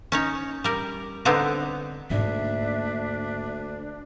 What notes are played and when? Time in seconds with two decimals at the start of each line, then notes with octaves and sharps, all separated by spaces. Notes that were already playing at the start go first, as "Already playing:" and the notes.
0.12 C#4 D#4 C#5
0.64 G3 A#4
1.25 D3 B3 C4 D#4
2.10 D2 G#2 A#3 D4 E5